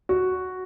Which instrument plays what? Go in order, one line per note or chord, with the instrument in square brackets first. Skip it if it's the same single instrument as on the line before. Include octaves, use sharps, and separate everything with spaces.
[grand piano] F#4